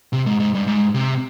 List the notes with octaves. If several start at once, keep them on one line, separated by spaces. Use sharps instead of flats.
C3
G#2
G#2
G2
G#2
C3